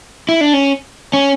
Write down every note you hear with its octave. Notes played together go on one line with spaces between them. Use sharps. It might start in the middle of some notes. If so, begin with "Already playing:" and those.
E4
D4
C#4
C#4